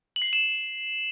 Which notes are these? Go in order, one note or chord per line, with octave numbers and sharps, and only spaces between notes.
F#7
C7
F#7
E7